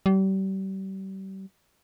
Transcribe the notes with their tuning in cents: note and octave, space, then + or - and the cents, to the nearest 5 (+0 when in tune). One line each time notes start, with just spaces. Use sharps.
G3 -35